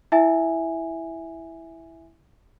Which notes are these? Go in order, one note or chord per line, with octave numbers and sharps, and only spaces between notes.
E4 E5 G#5